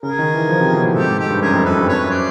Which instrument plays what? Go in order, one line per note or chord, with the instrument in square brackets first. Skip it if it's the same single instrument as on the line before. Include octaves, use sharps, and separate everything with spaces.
[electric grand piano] C#3 [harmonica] G#4 A#4
[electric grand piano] D#3
E3
F3
C3
B2
A2
[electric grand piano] G#2 [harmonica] G4 A4
[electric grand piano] G#2
[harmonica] G4 A4
[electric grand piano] G2
[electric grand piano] F#2 [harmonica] G#4 A#4
[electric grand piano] F2
[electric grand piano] F#2 [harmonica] A4 B4
[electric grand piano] G2
[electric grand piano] F2 [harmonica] B4 C#5
[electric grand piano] F#2
[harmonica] C5 D5